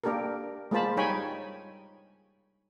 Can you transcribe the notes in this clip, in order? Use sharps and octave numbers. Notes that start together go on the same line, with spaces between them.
A#3 D4 G4 A4 A#4
G#3 A#3 F4 C5 A5 B5
G3 D#4 C#5 G5 G#5 B5